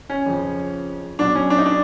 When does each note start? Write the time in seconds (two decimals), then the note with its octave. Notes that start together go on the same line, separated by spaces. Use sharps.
0.09 C#4
0.26 F2 C#3 F3
1.19 B2 F#3 D4
1.35 C#4
1.50 D4
1.58 D#4
1.66 D4